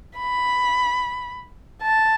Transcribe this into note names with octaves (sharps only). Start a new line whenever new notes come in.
B5
A5